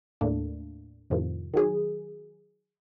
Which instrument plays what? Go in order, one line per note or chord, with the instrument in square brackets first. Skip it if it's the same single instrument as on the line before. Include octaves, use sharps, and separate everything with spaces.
[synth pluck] D#2 A2 A3 A#3 D4
F2 A2 C3 D#3 F3
D#3 F#3 G#4